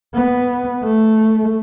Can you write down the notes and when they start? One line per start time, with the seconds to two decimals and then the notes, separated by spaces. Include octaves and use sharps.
0.14 B3
0.84 A3